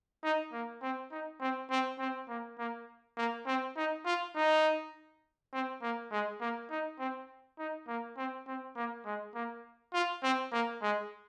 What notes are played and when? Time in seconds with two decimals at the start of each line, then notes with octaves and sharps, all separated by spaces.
0.24 D#4
0.53 A#3
0.82 C4
1.12 D#4
1.41 C4
1.70 C4
1.99 C4
2.29 A#3
2.58 A#3
3.17 A#3
3.47 C4
3.77 D#4
4.05 F4
4.35 D#4
5.53 C4
5.82 A#3
6.12 G#3
6.41 A#3
6.70 D#4
6.99 C4
7.59 D#4
7.88 A#3
8.17 C4
8.47 C4
8.76 A#3
9.06 G#3
9.35 A#3
9.94 F4
10.23 C4
10.52 A#3
10.82 G#3